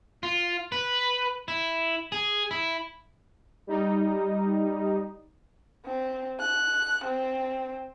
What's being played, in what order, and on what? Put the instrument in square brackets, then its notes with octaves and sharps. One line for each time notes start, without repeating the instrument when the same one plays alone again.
[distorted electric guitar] F4
B4
E4
G#4
E4
[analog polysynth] G3 D#4
[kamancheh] C4
F#6
C4